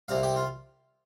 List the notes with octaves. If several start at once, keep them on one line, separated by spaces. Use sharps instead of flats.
C2 C3 G3 F5
G4
F4